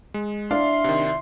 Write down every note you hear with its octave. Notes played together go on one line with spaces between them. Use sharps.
G#3
D4 E4 D5 F5 C6
C3 D#3